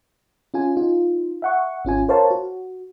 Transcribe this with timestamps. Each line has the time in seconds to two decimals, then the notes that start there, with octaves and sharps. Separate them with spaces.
0.54 C#4 F4 G#5
0.76 D#4 F4
1.42 E5 F#5 C#6
1.85 G#1 C#4 F4 G#5
2.08 A#4 C5 C#5 F5 A5
2.31 F#4